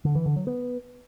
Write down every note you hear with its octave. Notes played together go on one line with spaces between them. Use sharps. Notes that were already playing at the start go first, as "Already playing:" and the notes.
D3
E3
D3
F#3
B3